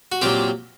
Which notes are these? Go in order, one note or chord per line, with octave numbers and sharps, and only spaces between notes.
F#4
A#2 F#3 C4 G4